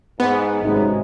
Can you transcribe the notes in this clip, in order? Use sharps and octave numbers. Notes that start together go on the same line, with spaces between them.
G#2 B3
G#1 F#2 C3 G#3 D#4